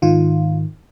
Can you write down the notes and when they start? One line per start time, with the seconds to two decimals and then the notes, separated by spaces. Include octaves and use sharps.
0.02 G#2 D#3 F4